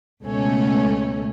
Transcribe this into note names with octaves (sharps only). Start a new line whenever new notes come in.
C#2 B2 A3 C#4